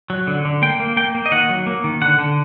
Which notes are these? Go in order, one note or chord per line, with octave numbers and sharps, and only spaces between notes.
F#3
D3
D3
A#3 G5
A#3
A#3 G5
A#3
D#5
D#3 F#5
F#3
A#3
D#3
D3 F#5
D3